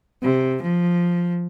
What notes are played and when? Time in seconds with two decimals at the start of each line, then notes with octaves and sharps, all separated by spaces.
0.23 C3
0.62 F3